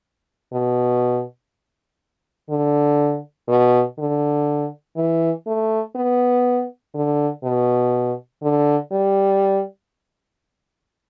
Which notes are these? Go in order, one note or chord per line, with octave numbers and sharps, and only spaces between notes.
B2
D3
B2
D3
E3
A3
B3
D3
B2
D3
G3